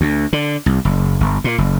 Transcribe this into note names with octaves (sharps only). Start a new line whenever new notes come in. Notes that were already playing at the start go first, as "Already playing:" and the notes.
D2
D3
C2
F#1
G1
A#2
F#1